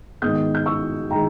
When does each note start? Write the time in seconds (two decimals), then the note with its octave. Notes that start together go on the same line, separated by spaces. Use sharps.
0.22 G#2 D#3 G#3 B3 D#6 G6
0.55 G6
0.66 C#6 E6
1.10 D#3 G#3 G5 A#5